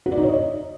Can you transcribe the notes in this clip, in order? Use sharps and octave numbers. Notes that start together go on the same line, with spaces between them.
F#4
D5
D#4
C#5
D#5